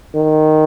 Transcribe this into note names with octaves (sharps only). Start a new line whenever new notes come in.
D#3